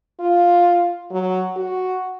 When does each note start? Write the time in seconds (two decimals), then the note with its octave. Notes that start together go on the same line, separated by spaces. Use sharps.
0.20 F4
1.11 F#3
1.56 F#4